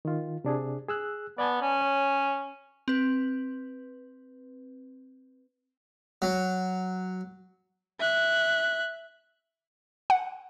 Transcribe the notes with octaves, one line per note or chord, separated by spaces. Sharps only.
D#3 F4
C3 D4 G#4
G#4 E6 F#6
B3 D5 G#5 A5
C#4
C#5
C4 B4
F#3
E5 F#6
F#5